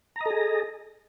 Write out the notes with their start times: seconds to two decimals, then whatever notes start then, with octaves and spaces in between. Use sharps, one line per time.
0.16 A#5
0.21 D#5
0.26 A4
0.30 G#4